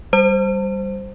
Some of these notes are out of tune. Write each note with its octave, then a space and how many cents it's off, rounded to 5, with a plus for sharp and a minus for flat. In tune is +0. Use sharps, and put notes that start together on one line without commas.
G3 +0 C5 +0